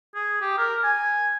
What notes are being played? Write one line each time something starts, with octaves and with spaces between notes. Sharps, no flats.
G#4
G4
A#4
G#5